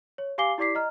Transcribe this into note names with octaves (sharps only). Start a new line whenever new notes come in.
C#5
G4 F5 G#5 D6 C7 G7
E4 G4 D5 D6 B6 C7
D#5 A#5 F6